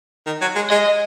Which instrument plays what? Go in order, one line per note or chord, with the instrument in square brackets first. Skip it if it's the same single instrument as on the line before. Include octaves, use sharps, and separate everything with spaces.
[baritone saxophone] D#3
F#3
G#3
[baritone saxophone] G#3 [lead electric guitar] D#5